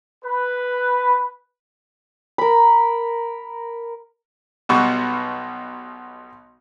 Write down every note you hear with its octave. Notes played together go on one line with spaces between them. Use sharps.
B4
A#4 B5
B1 B2 G3 B3